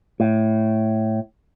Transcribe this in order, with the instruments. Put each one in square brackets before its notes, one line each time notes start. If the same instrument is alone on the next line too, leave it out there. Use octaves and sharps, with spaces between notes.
[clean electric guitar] A2